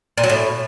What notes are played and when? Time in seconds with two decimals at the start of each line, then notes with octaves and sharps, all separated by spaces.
0.17 A#2
0.24 F#3
0.30 A2